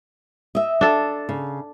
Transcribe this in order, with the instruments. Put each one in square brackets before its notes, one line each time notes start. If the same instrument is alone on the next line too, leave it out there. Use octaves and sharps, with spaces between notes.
[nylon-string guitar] D#5 E5
[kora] D4 A4
[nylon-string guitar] C#3